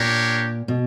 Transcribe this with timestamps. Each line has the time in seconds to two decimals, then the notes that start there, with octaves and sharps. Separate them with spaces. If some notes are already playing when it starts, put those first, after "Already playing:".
Already playing: A#2 D4 G4 A#4 C#5
0.68 B2